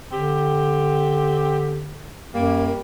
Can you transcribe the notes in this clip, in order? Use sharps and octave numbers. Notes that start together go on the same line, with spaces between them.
D3 C4 G4
F#2 G3 A#3